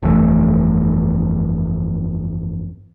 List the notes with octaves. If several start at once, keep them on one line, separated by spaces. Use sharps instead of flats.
G1 F2 E3 A3